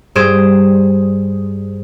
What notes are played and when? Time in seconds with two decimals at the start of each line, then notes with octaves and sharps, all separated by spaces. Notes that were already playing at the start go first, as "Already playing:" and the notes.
0.15 G2 G#4 C5 D7 E7